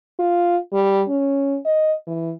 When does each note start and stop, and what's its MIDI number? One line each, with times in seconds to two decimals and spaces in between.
0.19 0.57 65
0.73 1.03 55
1.08 1.58 61
1.65 1.93 75
2.07 2.33 52